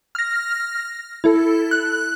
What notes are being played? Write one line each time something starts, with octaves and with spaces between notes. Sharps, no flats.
F6 A#6
E4 A4
F#6